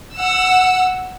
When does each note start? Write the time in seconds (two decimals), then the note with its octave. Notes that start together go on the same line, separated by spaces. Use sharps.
0.16 F#5 E6